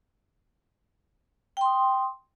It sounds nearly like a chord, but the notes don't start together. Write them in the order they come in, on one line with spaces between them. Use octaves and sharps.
G5 C6 D#6